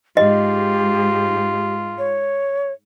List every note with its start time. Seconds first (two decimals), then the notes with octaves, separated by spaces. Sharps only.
0.17 G#2 F4 G4 D#5
1.98 C#5